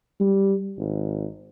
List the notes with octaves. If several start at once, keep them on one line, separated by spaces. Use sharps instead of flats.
G3
G#1